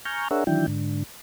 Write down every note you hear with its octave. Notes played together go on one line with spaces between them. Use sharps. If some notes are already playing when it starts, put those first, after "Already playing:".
G#5 A#5 C#6 F6 G6
D4 G#4 A#4 C#5 E5 F#5
D#3 E3 F#3 D4 E4 G5
G#2 D3